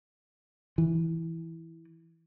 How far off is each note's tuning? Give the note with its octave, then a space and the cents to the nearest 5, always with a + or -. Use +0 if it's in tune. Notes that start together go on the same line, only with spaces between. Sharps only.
E3 -5